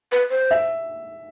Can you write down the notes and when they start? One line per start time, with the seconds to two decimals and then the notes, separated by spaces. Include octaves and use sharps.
0.12 B4
0.31 C5
0.51 E5